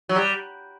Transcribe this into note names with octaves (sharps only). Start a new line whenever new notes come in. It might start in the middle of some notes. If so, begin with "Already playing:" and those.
F#3
G3